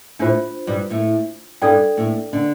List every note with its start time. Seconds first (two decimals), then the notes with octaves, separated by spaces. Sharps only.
0.19 A2 A3 D4 F4 C5
0.67 G2 G3
0.90 A2 A3
1.62 G2 G3 D4 A4 D5 G5
1.97 A2 A3
2.33 D3 D4